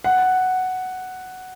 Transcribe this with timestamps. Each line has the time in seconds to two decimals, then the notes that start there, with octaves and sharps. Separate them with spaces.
0.04 F#5